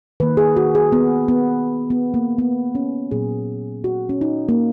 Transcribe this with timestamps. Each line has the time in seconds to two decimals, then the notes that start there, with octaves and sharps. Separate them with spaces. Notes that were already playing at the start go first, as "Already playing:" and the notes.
0.20 D#3 A#3 B4
0.37 G#4
0.56 F#4
0.75 G#4
0.92 B3
1.28 B3
1.90 B3
2.14 A#3
2.39 B3
2.75 C#4
3.11 A#2 F#3 A#3 G#4
3.84 F#4
4.09 C#4
4.21 D#4
4.49 A#3